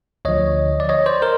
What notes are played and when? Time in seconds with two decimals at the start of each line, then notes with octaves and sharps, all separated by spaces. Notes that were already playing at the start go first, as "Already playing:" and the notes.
0.25 D2 D3 F3 C#5 D#5
0.80 D5
0.89 C#5 D#5
1.06 C5 D5
1.22 A#4 C5